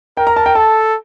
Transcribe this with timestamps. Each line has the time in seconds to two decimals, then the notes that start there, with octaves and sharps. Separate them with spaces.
0.17 A#4 G5
0.27 A#5
0.36 A5
0.46 G5
0.55 A4 A5